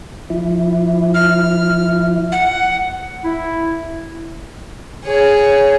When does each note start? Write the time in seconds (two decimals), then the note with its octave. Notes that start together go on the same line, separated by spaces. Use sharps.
0.30 F3 E4
1.14 F6
2.32 F#5
3.25 E4
5.05 G#4 C#5